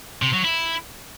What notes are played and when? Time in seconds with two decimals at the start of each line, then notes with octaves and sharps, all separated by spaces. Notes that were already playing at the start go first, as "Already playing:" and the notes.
0.22 C3
0.33 F#3
0.45 E4